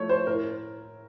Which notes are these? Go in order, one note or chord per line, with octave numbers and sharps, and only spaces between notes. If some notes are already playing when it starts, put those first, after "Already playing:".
Already playing: F3 A3 C#5
C5
A2 A#4